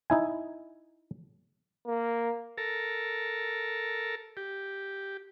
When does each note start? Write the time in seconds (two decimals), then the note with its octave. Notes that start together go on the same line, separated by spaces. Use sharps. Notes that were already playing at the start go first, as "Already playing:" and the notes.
0.10 D#4 E4 G#5
1.87 A#3
2.58 A4 A#4
4.37 G4